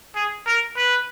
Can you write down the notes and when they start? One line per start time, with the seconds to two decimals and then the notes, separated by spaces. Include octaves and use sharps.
0.16 G#4
0.47 A#4
0.77 B4